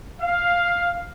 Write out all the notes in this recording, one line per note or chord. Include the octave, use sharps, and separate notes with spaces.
F5